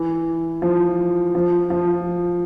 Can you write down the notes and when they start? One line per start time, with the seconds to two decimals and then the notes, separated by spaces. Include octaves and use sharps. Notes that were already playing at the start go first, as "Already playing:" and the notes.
Already playing: E3
0.62 F3
1.35 F3
1.70 F3